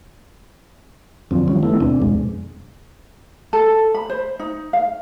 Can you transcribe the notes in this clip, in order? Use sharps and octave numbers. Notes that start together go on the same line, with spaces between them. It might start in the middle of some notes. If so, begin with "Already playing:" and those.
F2 D3 F3 F#3 C4
D#3 F3 G3 C#4
A3 B3 E4
D#2 B2 C4 D4
F2 B2 G#3
A4
B5
C5
D#4
F5